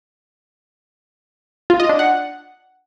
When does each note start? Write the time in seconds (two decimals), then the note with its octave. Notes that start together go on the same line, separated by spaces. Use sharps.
1.70 F4
1.80 D#5
1.89 D4
1.99 F#5